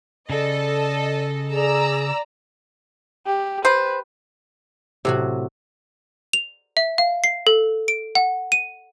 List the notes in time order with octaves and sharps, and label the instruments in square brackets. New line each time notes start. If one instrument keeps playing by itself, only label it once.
[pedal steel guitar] C#3 [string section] A4 D#5 [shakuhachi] D5
[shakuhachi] G#4 [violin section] D5 A#5 E6
[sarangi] G4
[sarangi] B4 [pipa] C5
[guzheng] A2 F#3 F#4 [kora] C3
[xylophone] F7
E5
F5
C7
A4
D7
F#5
D#7